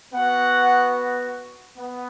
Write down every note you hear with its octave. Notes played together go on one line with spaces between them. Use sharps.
B3 F#4 F#5
B3